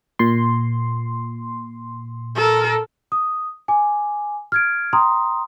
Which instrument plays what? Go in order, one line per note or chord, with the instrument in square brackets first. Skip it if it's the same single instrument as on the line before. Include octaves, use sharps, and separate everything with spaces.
[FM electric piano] A#2 C6
[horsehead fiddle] A4 A#4
[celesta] D#6
G#5 D6
F6 G#6 D7
G5 A#5 C6 D#6